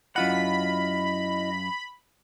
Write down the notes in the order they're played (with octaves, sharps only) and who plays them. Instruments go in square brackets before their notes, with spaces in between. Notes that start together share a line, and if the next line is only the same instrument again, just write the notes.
[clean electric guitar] F#2 F4 F#5 [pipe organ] E4 D#5 [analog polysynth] B5